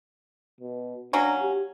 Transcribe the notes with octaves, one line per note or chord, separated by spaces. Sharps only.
B2
F#3 A#3 C#4 D4
G4